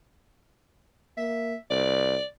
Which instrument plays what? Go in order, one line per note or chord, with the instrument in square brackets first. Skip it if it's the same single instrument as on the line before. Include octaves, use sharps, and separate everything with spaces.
[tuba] A#3 [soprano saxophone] E5
[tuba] C2 [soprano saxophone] D5